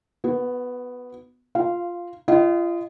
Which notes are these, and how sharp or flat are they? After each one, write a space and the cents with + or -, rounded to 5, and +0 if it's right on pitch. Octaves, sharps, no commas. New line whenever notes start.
B3 +5 F#4 -30
F4 +0 F5 -20
F4 -35 D#5 +0 F#5 +45